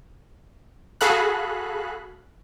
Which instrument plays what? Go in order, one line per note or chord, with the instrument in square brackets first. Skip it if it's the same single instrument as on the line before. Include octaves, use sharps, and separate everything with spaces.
[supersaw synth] F#4 G#4 A4 F5 B5 F#6